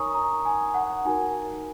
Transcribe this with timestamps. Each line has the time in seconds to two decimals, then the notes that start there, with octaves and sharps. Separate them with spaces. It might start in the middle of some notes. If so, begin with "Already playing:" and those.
Already playing: D#4 A#4 C#5 G#5 A#5 C#6 D#6
0.15 A#5
0.45 G#5
0.74 F#5
1.05 D#4 F#4 A#4 G#5